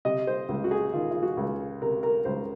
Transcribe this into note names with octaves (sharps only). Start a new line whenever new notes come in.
C3 D#5
C5
C#2
F#4
G#4
D#3 F4
F4
F#4
C#2
C3 A#4
A#4
C#2 C5